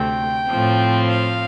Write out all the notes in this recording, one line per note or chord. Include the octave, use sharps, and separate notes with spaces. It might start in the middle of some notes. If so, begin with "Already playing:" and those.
Already playing: D2 C3 A3 C4 G5
A2 F3 C4
F5